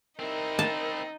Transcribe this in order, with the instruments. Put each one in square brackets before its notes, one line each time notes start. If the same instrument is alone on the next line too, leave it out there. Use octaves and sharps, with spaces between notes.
[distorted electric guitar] C4 E4 [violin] D#4 [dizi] A#4
[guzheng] A5